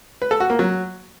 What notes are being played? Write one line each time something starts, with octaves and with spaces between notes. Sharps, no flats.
B4
A4
F#4
A#3
F#3